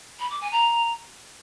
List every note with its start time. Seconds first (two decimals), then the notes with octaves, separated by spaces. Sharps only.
0.19 B5
0.30 D6
0.41 G#5
0.51 A#5